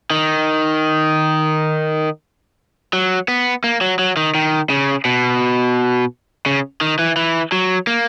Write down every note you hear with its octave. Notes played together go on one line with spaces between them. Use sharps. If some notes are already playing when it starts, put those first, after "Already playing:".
D#3
F#3
B3
A#3
F#3
F#3
D#3
D#3
C#3
B2
C#3
D#3
E3
E3
F#3
A#3